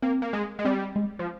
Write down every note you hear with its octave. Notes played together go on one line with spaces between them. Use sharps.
A#3 C4
A#3
G#3
G#3
G3 C4
G#3
F3